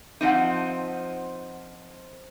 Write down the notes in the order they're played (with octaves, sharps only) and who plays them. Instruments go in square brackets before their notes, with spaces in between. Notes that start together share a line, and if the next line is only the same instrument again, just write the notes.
[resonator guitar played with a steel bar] F3 C4 D#4 [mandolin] F#5 C6 D#6